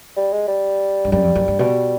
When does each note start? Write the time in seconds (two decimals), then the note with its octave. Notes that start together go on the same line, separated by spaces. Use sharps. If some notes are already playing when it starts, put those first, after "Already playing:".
0.17 G3
0.33 G#3
0.48 G3
1.05 G2
1.12 F#2 G3
1.24 F2
1.35 F#2
1.48 G2
1.59 B2 G3